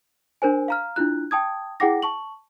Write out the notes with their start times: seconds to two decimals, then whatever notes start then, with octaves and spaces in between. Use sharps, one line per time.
0.42 D4 A#4 C5 G#5
0.68 F5 A#5 F6
0.96 D4 E4 F4 F#6
1.31 G5 A5 D#6 G#6
1.80 E4 G#4 F#5 G5 D6 A#6
2.02 A5 C#6 F#7